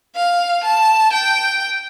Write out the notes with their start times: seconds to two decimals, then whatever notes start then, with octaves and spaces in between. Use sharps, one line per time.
0.16 F5
0.64 A5
1.13 G5